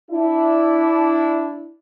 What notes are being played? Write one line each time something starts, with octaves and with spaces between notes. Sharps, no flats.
D4 E4